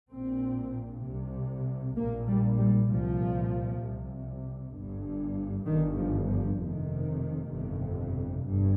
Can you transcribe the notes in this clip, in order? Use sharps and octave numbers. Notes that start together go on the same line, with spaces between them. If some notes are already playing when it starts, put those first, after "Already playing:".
A#1 A#2 C4
C3
C2
A#1 A#2 A#3
G3
G3
C2 A#2 F3
C2 C3
G1 G2
G1 G2 D#3
F3
F3
F1 F2 C3 D#3
G1 F2 C3
G1 G2